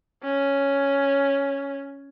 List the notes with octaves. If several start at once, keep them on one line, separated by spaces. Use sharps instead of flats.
C#4